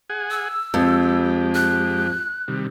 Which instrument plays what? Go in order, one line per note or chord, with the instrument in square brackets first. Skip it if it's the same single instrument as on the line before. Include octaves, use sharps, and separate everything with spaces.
[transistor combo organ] G#4 F#5 G#5
[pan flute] E6
[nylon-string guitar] F2 [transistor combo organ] G#3 G4
[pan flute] F#6
[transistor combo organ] C3 D#3 G3